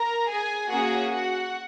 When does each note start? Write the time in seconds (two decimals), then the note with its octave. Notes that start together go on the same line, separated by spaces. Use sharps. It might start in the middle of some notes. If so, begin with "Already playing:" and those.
Already playing: A#4 A#5
0.31 G#4 G#5
0.71 A#3 C#4 F#4 G#4 F#5
1.13 F#4 F#5